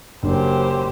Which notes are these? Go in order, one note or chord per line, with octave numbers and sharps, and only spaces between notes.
F#1 F#2 D4 G4 C5